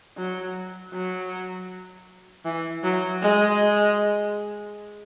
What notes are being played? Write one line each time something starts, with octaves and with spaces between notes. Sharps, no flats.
F#3
F#3
E3
F#3
G#3